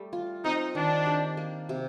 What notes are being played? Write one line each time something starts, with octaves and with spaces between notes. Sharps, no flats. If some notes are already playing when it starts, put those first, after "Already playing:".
Already playing: G3 A3
F4
C4 D#4
D#3 D4
G4
A#3
C3